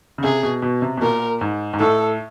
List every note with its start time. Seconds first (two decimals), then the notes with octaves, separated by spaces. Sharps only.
0.18 C#3
0.23 C3 G#4
0.43 B2
0.62 B2
0.82 C3
0.98 B2
1.02 A#2 A#4
1.41 G#2
1.74 G#2
1.80 A2 A4